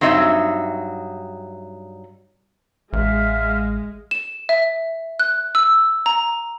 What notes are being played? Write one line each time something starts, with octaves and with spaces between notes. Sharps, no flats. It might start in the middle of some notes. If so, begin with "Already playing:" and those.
G2 F#3 C4 D#4 E5
A1 G#3 E5 F5 F6
E7
E5
F#6
E6
A#5